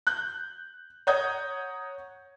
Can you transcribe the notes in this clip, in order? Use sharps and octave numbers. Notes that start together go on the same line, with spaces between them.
F#6 G6
C#5 F#5 A#5 D#6 G6 G#6